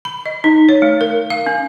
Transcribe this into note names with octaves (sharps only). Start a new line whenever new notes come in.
B5
D#5
D#4
C#5
A3
A#4
F5
C#4